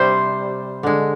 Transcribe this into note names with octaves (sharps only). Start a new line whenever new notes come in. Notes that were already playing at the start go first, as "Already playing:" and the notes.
Already playing: C3 G3 C5
D3 G#3